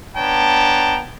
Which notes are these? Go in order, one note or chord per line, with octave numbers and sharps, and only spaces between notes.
B3 D4 C#5 G5 A5 A#5